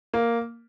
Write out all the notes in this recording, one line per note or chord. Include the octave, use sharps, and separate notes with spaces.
A#3